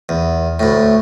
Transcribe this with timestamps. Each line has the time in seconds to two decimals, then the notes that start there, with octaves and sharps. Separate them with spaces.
0.09 E2
0.60 D2 A2